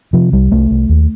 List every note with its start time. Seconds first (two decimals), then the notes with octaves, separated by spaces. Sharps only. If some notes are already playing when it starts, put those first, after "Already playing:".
0.13 C3 F3
0.33 C2 G3
0.52 C2 A3
0.71 C2
0.89 D#2